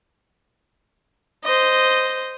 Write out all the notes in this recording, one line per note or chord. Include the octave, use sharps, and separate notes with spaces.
C5 D#5